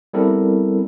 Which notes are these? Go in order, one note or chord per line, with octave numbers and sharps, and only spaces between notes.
G3 B3 C4 E4 A4 A#4